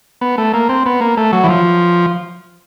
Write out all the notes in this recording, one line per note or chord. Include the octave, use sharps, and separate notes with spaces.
B3
A3
A#3
C4
B3
A#3
A3
F#3
E3
F3